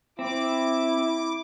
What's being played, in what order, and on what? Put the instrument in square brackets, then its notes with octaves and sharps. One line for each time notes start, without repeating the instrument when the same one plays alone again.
[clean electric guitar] C4 [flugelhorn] E4 [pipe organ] D6